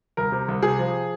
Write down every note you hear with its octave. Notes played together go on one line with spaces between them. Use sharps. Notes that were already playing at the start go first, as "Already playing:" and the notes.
C2 A#4
C3
C2
C3 G#4
F3